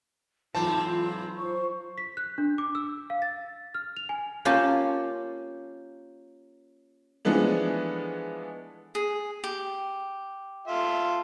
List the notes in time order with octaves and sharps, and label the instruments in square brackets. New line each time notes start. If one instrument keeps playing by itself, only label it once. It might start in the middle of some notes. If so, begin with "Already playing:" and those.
[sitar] G#2 E3 C4 [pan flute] F#3 [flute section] F4 [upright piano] A5
[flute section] F4 C5 C#6
[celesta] B6
F#6
D4
D6
E6
F5
A6
F6
F7
G#5
[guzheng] A#3 C#4 F4 G4 A5
[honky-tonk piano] E3 F3 G#3 A3 B3 D4
[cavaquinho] G#4
G4
[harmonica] F4 A4 E5